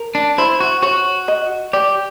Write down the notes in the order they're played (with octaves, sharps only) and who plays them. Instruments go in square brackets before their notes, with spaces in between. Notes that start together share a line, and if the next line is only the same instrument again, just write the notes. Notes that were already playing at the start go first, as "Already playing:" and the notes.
Already playing: [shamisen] A#4
[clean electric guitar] D4
[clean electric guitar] E4 [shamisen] C5
[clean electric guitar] F#4
[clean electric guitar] F#4 [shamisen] C#5
[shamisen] D#5
[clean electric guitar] G4 [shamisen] D5